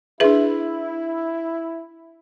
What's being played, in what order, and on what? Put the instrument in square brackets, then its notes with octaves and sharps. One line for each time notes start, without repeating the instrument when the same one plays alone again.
[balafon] D4 B4 [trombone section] E4 [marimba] G#4 E5